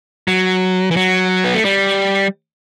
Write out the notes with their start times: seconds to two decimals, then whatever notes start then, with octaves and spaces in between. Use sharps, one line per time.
0.28 F#3
0.91 E3
0.96 F#3
1.44 B3
1.54 A3
1.65 G3